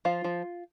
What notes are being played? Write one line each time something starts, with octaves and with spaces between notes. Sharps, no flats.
F3 F4
F3